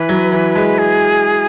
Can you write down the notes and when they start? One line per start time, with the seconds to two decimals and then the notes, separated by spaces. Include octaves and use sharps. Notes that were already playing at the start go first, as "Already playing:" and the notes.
Already playing: E3 B4
0.09 F#3
0.32 E3
0.55 G#3
0.78 G#4